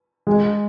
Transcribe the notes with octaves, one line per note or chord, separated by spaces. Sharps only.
G#3